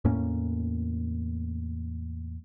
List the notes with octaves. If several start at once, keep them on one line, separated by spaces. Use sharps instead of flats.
E2 A2 A#3 C#4